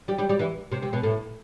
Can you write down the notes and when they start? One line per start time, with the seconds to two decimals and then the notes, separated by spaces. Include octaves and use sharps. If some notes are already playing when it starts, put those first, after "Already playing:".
0.08 G3 G4
0.18 G3 G4
0.29 G3 G4
0.39 E3 E4
0.72 C3 C4
0.82 C3 C4
0.93 B2 B3
1.03 A2 A3